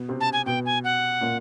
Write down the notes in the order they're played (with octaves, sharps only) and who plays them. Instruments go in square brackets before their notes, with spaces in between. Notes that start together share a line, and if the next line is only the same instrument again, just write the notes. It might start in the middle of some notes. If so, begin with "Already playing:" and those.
Already playing: [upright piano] B2 B3
C3 C4
[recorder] A5
G#5
[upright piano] B2 B3 [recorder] G5
[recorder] G#5
F#5
[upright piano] A#2 A#3